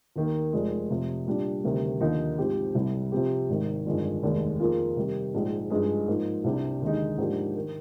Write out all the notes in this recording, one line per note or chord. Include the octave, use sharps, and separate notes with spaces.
D#2 D#3 A#3
F1 F2 D#3 G#3
F1 F2 C3 F3
A#2 G3 D4
D2 C3 D#3 G3
D#2 D3 F3 A#3 D#4
G#2 F3 C4 G4
C2 C3 G3
C3 F3 C4 G4
G#1 G#2 D#3
G1 F2 D#3 G#3 D4
F1 D#2 D#3 G#3
F2 D#3 A#3 F4 G#4
C3 D#3 G3
A#1 G#2 F3 G#3
G2 F3 G#3 D#4 G#4
G#2 F3 A#3 D#4
C2 C3 G3 D4 G4
D#2 D3 G#3 D#4
G#2 F3 A#3 D4 G4
D#3